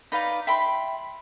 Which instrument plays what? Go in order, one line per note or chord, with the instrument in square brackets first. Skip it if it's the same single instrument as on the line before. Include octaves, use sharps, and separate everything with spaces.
[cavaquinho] D#4 B4 D5 F5
E5 G5 B5 C6